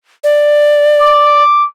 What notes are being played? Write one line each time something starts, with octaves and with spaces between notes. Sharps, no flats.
D5
D6